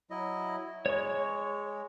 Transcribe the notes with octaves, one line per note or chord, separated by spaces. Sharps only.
F#3 E4 D#5
G#3 C#5 C#6